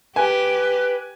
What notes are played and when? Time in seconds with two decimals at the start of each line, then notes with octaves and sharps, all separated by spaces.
0.16 G4 B4 G#5